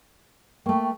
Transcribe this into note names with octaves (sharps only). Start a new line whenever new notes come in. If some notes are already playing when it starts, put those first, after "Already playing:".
A3 A#3 G5 C#6